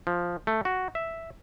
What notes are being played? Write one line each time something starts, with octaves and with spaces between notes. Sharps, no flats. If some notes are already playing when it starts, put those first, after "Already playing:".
F3
A3
F#4
E5